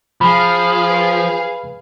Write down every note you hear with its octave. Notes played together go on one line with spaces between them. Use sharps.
F3 G#4 F5 B5
B4